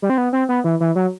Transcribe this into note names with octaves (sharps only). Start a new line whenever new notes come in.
G3
C4
B3
C4
B3
E3
E3
F#3